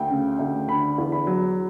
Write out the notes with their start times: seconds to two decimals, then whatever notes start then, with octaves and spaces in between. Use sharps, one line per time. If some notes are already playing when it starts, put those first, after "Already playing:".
Already playing: D2 G5
0.10 C#3
0.39 D2
0.68 D3 B5
0.98 E2
1.12 B5
1.27 F#3